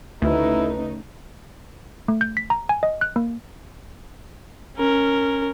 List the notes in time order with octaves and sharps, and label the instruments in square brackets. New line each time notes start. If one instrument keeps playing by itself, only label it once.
[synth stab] D2 [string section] C#3 A3 D#4 [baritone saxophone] E4 [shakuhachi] B4
[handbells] A3
G6
B6
A#5
G#5
D#5
F#6
A#3
[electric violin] C#4 A#4